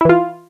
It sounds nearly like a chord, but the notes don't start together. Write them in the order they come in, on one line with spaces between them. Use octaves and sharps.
E4 E3 F4